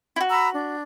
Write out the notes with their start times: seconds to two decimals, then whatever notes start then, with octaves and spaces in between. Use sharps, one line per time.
0.16 E4 F#4
0.30 A#5 B5 E6
0.54 D4